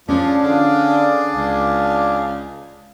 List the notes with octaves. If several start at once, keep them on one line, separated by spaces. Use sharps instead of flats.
F3 C#4 D4 G#4 D5
D3 F5
C#2 F5